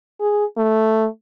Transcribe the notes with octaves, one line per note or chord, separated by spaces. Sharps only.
G#4
A3